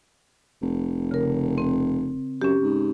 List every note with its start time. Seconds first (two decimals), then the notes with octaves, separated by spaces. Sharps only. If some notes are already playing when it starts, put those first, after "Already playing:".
0.62 F1
1.11 C#3 A#4
1.58 C4
2.42 F#2 C#4 G4
2.63 G#2